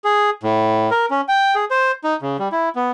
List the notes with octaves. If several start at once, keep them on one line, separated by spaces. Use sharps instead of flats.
G#4
A2
A#4
C#4
G5
G#4
C5
D#4
C#3
G3
E4
B3